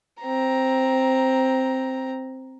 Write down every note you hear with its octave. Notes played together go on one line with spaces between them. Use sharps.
C4 A#5